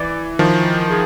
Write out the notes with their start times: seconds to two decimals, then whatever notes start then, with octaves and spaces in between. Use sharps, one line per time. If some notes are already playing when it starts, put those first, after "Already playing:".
Already playing: E3 D5
0.39 D#3 F3
0.90 G#4